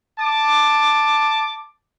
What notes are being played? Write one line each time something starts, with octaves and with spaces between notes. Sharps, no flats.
A5 D6